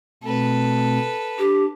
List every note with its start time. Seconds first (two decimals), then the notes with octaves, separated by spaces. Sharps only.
0.23 B2 A3 C4 A4 B4
1.39 D4 G4